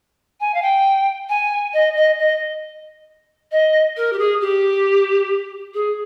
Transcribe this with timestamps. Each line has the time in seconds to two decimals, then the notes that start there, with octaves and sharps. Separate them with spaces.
0.41 G#5
0.54 F5
0.62 G5
1.29 G#5
1.74 D#5
1.96 D#5
2.19 D#5
3.52 D#5
3.97 A#4
4.13 G4
4.19 G#4
4.41 G4
5.74 G#4